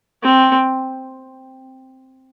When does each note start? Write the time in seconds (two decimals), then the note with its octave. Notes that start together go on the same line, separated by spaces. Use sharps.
0.23 C4